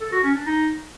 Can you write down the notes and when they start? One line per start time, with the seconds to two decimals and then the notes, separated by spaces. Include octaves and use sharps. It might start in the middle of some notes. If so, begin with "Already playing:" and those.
0.01 A4
0.12 F#4
0.23 C#4
0.34 D4
0.46 D#4